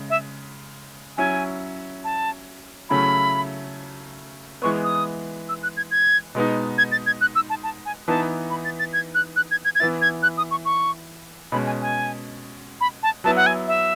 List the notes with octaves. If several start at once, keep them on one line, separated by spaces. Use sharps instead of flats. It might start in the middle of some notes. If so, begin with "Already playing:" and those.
Already playing: C#3 G#3
E5
F#3 C#4 E4 G#5
A5
C#3 F#3 A3 C#4 E4 B5
E3 G#3 B3 C#6
D#6
E6
F#6
G#6
G#6
B2 G#3 B3 D#4
G#6
A6
G#6
F#6
E6
A5
A5
G#5
E3 B3 D#4 A5
B5
A6
A6
G#6
F#6
F#6
G#6
G#6
G#6
E3 B3 E4 A6
G#6
F#6
D#6
C#6
C#6
B2 G#3 C#4 B5
G#5
G#5
B5
A5
F#3 B3 E4 A5
F#5
G#5
E5